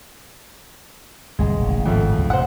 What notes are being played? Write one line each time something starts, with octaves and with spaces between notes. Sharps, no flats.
G1 C2 G2 G#3
D#1 A1 C#3
G#1 F2 A3
C#2 A2
F2 C3 C5 F#5